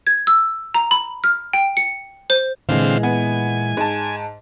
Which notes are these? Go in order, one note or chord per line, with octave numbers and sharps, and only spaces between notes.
G#6
E6
A#5
B5
F6
G5
C#7
C5
A#2 D3 E3 G#3 C4 F5
B3 G#5
G#2 A5